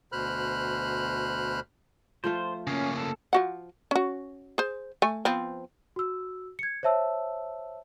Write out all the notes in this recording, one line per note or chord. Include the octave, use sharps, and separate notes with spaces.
D2 B2 C5 B5 F6 F#6
F3 A3 F4 C5
C#3 A#3 C#4
A4
F3 F#4 F#5
C#4 F#4
G#4 C5
A3 G#5
F3 B3 C4
F#4 E6
G#6 C#7
C5 C#5 E5 A5 E6